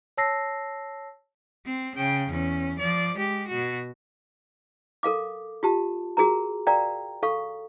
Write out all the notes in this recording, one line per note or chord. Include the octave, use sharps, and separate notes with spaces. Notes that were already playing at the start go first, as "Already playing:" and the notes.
C#5 A5 E6 A#6 C7
C4
C#3 G5
E2 C#4
F3 D5
G#3 G4
B2 F#4
A4 A#4 F5 D6
F4 G4 A5
F#4 G#4 A#4 A#5
A#4 D5 F5 G5 A#5
A4 F5 C#6